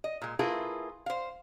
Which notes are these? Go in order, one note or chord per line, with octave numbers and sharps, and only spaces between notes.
D#5
A#2 G#3
A3 E4 F4 G#4 A#4 B4
C5 F5